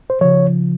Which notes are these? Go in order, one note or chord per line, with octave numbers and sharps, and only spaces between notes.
C5
C#3 F3 C#5